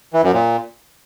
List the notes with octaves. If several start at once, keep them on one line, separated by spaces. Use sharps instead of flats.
E3
F#2
A#2